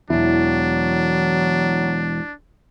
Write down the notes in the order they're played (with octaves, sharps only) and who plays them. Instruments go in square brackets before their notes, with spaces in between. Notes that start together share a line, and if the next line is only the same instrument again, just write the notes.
[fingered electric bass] E1 E2 [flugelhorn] F#3 [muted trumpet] D4 [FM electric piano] E4